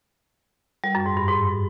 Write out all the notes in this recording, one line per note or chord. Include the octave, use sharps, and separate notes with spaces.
G3
F#2
G#2
G2
G#2